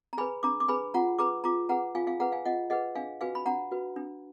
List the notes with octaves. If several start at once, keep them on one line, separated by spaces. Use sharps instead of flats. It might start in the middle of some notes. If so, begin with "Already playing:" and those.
A#5
G#4 B4 G#5 B5
D4 A#5 D6
D6
G#4 B4 G#5 B5
F4 F#5 A#5
G#4 B4 A#5 D6
F4 A#5 D6
G#4 B4 F#5 A#5
F4 F5 G#5
F5 G#5
G#4 B4 F#5 A#5
F5 G#5
F4 D#5 F#5
G#4 B4 D#5 F#5
D4 F5 G#5
F#4 B4 F5 G#5
B5
D4 F#5 A#5
F#4 B4
D4